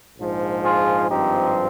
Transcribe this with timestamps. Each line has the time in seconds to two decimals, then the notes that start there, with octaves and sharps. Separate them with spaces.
0.17 A#1 G#2 F3
0.64 F4 G#4
1.10 G#1 G2 F3 C4 D#4 G4